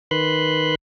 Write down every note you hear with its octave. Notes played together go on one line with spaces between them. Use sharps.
D#3 B4 B5 C6 F#6